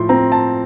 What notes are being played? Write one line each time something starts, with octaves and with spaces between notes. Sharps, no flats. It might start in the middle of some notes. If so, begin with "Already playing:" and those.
Already playing: A2 F3 C6
C4 A#5
A5